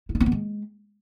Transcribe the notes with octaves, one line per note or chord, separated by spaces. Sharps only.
E4
D#4
C4
B3
G#3